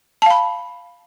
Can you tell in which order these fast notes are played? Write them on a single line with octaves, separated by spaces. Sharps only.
A5 F5 B5